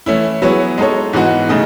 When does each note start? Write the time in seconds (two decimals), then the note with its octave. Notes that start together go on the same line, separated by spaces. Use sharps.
0.06 E3 A3 C#4 E4
0.42 F#3 B3 E4 G#4 C#5
0.78 G#3 D#4 A4 C#5
1.13 G#2 E3 B3 F#4
1.49 C#3 E3 A3 D#4